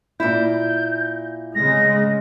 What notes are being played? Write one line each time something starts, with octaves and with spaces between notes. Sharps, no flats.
A#2 E4 G6
C#3 G#3 A#6